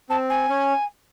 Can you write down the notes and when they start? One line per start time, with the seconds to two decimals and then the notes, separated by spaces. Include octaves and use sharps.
0.09 C4 A5
0.29 G#5
0.49 C#4